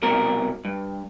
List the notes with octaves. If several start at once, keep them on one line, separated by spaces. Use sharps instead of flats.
C2 B2 A#4
G2